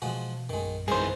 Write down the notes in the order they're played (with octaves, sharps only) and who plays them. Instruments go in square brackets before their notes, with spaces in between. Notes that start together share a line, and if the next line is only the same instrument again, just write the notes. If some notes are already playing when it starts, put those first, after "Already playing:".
[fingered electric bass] B2 E3 [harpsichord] F3 G#3 F#4
[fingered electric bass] A#1 F#2 [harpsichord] D#3 G#3
[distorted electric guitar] G#2 E3 [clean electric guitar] G#4 C5 [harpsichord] A#4